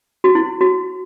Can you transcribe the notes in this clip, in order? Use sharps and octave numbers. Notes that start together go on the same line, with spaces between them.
F#4
E4
F#4